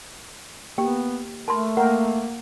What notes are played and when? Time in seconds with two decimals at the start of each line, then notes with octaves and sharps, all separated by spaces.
0.78 A#3 B3 G4 G5
1.48 A3 A#4 A5 B5 C6
1.77 A#3 A#4 F#5 G5